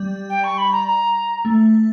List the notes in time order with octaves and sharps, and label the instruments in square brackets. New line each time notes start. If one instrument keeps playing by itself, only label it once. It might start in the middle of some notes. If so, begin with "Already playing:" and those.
Already playing: [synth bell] G3
[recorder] G5
C#6
B5
A#5
A#5
[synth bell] A3